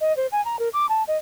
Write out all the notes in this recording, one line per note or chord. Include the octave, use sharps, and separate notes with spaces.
D#5
C5
G#5
A#5
A#4
D6
A5
D#5